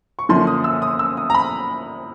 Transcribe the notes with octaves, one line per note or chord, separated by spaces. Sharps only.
C#6
F#2 D3 F3 A#3 C6
D#6
E6
D#6
E6
D#6
A#5
B5